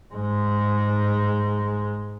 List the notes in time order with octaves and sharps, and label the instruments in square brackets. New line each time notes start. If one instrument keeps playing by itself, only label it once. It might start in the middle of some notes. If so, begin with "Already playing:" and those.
[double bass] G#2 G#3